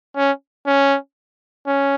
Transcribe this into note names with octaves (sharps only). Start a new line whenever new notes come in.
C#4
C#4
C#4